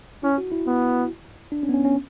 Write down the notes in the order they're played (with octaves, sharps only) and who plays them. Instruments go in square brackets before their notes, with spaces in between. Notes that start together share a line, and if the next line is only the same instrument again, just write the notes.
[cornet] C#4 [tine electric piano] E4
[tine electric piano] F#4
E4
[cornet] B3
[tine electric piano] D4
C#4
B3
C#4
C#4